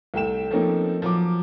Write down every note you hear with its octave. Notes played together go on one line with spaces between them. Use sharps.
C2 A3 G5 E7
F3 A3 A#3 C4 C#4 D#4
F3 F#3 D6